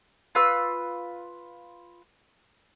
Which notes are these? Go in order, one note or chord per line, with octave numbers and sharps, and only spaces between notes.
F4 B4 E6